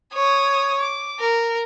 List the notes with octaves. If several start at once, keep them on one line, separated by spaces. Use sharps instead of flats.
C#5 D#6
D6
A#4